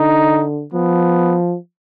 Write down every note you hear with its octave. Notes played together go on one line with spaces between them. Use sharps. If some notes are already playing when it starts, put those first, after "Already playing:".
Already playing: D3 D#4
F3 B3